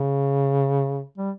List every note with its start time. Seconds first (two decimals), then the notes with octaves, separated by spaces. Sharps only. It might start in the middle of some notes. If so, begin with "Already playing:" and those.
Already playing: C#3
1.18 G3